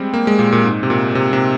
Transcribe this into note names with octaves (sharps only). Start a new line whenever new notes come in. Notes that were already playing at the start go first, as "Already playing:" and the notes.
Already playing: G3 G#3 C4
A#3
G#3
A#2
A#2
G#2
C3
A#2
C3
C3